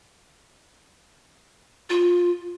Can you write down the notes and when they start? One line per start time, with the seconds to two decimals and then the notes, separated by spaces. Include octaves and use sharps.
1.90 F4